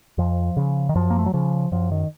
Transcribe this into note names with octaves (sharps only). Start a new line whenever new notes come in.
F2 F3
C#3
D#3
F#2 F3
A#3
A3
F#3
C#3 F3
F#2 F3
D#3